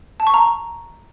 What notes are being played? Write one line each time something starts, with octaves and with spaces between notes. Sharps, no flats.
A5
C#6
A#5